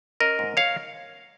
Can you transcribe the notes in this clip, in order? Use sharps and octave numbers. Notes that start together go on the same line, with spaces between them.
C#4 A#4 D#5
G#2
C#5 F5